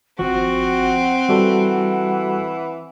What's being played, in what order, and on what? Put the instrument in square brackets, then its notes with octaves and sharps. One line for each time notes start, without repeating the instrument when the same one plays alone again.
[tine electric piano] G#1 F3 [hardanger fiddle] C4 [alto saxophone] F#4 [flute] F#5
[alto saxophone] E3 [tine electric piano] G3 F#4 A4